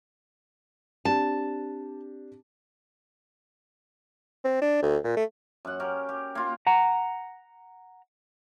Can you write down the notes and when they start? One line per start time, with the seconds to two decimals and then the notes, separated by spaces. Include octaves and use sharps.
1.05 C4 D4 G4 A5
4.45 C4
4.62 D4
4.82 D2
5.04 A#2
5.17 A3
5.65 F#2 F#5
5.80 C#4 G4 A#4
6.09 G4
6.35 A#3 F4
6.67 F#5 A#5